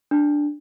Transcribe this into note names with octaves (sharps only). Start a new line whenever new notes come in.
D4